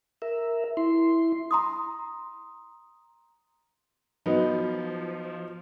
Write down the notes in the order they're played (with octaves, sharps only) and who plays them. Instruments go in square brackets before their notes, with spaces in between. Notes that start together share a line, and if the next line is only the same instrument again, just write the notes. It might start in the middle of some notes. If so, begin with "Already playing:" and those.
[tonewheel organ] A#4 E5
E4 C6
[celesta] A#5 C6 D#6
[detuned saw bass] F3 [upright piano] F#3 B3 D#4